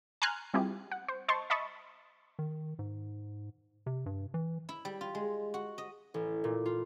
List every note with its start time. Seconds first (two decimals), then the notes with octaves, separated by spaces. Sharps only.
0.22 G#5 A#5 C6 F6 F#6 G#6
0.54 G3 C4 E4 F4 G4 G#4
0.91 F#5
1.08 C5
1.28 C5 D#5 A5 C6 C#6
1.50 D#5 E5 A5 B5 C#6 D#6
2.39 D#3
2.79 G#2
3.86 C3
4.06 G2
4.34 E3
4.69 E4
4.85 G3
5.01 F4
5.15 G#3
5.54 F#4
5.78 D#5
6.14 A1
6.44 A#2
6.66 F4